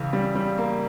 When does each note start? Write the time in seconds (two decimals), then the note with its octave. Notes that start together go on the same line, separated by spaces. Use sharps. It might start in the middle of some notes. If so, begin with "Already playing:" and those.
Already playing: C#2 C#3 E3
0.13 G3
0.35 G3
0.58 A#3